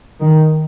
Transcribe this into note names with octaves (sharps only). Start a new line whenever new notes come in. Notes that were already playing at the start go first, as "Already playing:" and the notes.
D#3